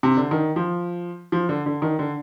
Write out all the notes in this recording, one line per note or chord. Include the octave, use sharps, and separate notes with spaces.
C3
D3
D#3
F3
F3
D3
D3
D#3
D3